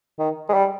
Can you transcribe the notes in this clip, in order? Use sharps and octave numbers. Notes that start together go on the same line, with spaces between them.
D#3
G#3
G3